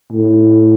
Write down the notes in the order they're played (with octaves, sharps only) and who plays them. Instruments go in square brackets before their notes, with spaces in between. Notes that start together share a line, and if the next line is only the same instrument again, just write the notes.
[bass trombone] A2